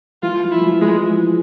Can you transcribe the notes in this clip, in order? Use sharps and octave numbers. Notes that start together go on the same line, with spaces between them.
E3 F4
F3
E4
E3
F3
G#3
F3
F3